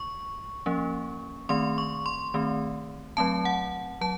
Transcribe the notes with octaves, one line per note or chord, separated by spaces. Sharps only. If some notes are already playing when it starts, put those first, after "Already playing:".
Already playing: C#6
F3 A#3 C#4
D#3 A3 C4 C6
C#6
C6
D#3 A3 C4
F#3 A3 C4 A5
F#5
F#3 A5